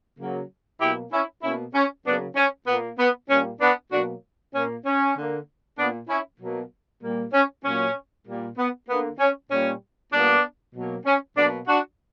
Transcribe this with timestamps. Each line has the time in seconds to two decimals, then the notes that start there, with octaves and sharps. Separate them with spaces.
0.19 C#3 F#3 A#3
0.81 B2 F#3 A#3 E4 G4
1.12 C#4 E4
1.43 B2 A#3 C#4 E4
1.75 C#4
2.05 C#3 F#3 A#3 B3 D4
2.36 C#4
2.67 A#2 A#3 B3
2.99 B3
3.29 A#2 G3 A#3 C#4
3.61 B3 D4
3.92 B2 F#3 A#3 D4 F#4
4.54 A#2 A#3 C#4
4.86 C#4
5.16 D3 A#3
5.78 A#2 A#3 B3 D4
6.09 C#4 E4
6.41 B2 F#3 A#3
7.02 A#2 G3 A#3
7.33 C#4
7.64 A#2 F#3 A#3 C#4
8.26 A#2 G3 A#3
8.58 B3
8.89 D3 A#3 B3
9.19 C#4
9.51 A#2 G3 A#3 C#4
10.13 A#2 G3 A#3 B3 D4
10.74 B2 F#3 A#3
11.06 C#4
11.37 B2 F#3 A#3 B3 D4
11.68 D4 F#4